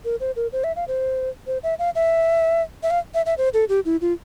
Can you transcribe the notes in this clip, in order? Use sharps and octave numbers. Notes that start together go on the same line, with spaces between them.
A#4
C5
A#4
C5
E5
F5
C5
C5
E5
F5
E5
E5
F5
E5
E5
C5
A4
G4
E4
F4